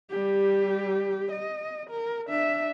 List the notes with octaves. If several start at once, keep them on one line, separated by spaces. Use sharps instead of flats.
G3 G4
D#5
A#4
D4 E5